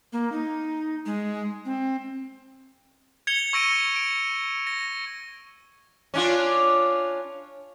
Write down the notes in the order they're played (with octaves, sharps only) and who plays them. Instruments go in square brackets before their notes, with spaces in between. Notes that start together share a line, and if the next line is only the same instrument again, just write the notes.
[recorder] A#3
D#4
G#3
C4
[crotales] G#6 C#7 F7 G7
C#6 E6 A#6 D7 D#7
D7
A#6
[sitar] C#4 D4 F4